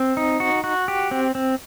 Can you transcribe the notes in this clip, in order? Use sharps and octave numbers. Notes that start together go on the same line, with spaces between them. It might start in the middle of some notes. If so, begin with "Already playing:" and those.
Already playing: C4
D#4
F#4
F#4
G4
C4
C4